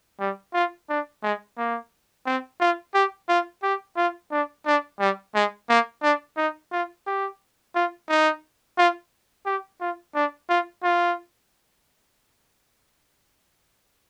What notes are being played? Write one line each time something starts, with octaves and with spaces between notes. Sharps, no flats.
G3
F4
D4
G#3
A#3
C4
F4
G4
F4
G4
F4
D4
D4
G3
G#3
A#3
D4
D#4
F4
G4
F4
D#4
F4
G4
F4
D4
F4
F4